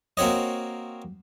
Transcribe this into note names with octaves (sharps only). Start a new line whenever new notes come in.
A#3 C4 F#4 C#5 D#5